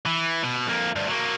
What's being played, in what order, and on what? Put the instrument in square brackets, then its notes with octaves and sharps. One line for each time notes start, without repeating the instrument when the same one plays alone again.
[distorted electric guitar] E3
B2
F2 A#3
D2 G2
F#3 A#3